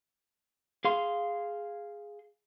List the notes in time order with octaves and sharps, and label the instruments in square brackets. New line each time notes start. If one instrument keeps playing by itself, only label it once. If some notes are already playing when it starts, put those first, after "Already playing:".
[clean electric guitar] G#4 F5 C6